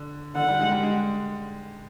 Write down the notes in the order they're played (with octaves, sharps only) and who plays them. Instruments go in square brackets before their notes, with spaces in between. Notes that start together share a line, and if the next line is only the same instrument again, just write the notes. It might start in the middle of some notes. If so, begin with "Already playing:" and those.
Already playing: [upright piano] D3
[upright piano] D3 [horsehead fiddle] F#5
[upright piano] G3
G#3
G3
G#3